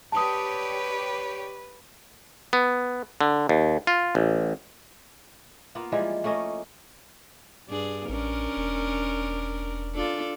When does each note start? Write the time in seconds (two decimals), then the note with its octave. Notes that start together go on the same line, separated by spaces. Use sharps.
0.12 G4 B4 C#5 D5 A5 D#6
2.53 B3
3.21 D3
3.49 D#2
3.87 F4
4.15 A1
5.75 A#3 B3 F4
5.92 E3 F3 G3 G#3
6.24 A3 A#3 C#4 D#5
7.68 G2 D4 G#4
8.09 A1 C#4 D4 A#4
8.57 E1
9.95 D4 F4 A4